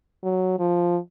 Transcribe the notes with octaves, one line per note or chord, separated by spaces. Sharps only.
F#3
F3